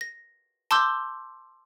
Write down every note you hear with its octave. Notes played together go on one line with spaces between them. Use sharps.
A#6
A5 C6 D6 E6 G6 G7